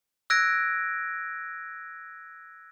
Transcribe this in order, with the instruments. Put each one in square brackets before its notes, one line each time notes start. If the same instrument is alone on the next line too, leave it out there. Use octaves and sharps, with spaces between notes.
[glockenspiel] E6 F#6 G#6 A#6 D7